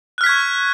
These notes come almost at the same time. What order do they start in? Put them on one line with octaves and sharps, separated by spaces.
F#6 F6 B6 G#6 C#6